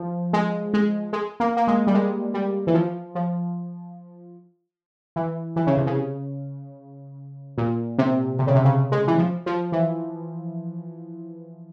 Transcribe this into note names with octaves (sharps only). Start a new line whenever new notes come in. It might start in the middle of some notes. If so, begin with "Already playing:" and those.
Already playing: F3
G#3
G#3
G#3
A#3
A#3
G#3
G3
G#3
G3
E3
F3
F3
E3
E3
C#3
C3
C#3
A#2
C3
C3
C#3
C3
C#3
G#3
E3
F3
F3
E3